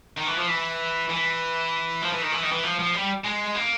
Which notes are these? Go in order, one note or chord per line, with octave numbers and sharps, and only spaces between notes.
D#3
E3
F3
E3
E3
F3
E3
D#3
E3
D#3
E3
F3
F3
G3
G#3
A#3